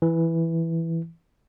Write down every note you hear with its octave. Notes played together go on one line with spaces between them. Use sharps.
E3